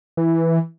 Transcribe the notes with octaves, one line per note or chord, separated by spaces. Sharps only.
E3